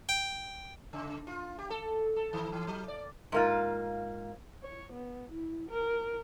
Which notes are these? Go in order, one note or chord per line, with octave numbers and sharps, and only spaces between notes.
G5
C#3
F4
G4
A4
A4
D#3
E3
F#3
D5
G#2 A#3 F4
C#5
B3
E4
A#4